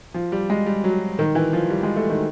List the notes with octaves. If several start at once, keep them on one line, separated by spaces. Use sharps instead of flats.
F3
G3
G#3
G3
F#3
D#3
E3
F3
G3
G#3
A3
D#3